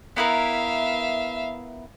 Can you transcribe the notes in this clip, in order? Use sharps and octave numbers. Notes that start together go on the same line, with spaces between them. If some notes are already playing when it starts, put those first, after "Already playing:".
B3 E4 A#4 E5 F5